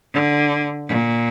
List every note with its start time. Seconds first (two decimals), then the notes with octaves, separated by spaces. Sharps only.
0.14 D3
0.88 A#2